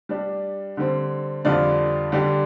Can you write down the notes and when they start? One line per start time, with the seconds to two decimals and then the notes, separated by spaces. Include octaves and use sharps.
0.09 G3 D4 G4
0.77 D3 G3 C4
1.45 F2 D3 G3 F4 D5
2.12 D3 G3 D4 G4